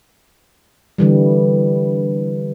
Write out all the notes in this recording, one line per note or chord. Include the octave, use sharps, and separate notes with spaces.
D3 E3 G3